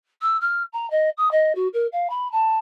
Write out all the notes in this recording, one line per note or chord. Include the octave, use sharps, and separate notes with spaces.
E6
F6
A#5
D#5
D#6
D#5
F#4
A#4
F5
B5
A5